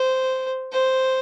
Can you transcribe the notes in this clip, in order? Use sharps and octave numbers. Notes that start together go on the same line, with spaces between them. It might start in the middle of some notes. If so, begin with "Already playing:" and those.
Already playing: C5
C5